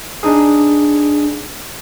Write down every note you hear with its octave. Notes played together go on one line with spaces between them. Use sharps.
D4 D#4 G#4